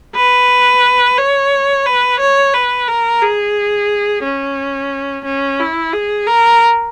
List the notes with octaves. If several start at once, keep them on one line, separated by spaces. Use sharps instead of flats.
B4
C#5
B4
C#5
B4
A#4
G#4
C#4
C#4
E4
G#4
A#4